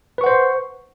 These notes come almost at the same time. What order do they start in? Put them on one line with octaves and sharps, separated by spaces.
B4 C#6 F#5 C5